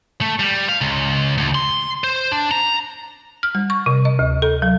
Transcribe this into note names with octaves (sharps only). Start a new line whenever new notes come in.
A3
G3
F5
C#2
D2
C6
C5
D4
A#5
F6
G3
C#6
C3
D#5
D2
A4
F#3